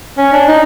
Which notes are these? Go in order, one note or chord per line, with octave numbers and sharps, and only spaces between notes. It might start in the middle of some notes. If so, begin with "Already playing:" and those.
C#4
D4
D#4